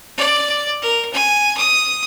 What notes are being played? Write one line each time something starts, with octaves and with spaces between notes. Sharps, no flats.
D5
A#4
G#5
D#6